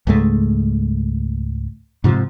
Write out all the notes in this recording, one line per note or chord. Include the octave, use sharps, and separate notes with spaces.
C#2 G#2 G#3 A3
G#2 C3 F3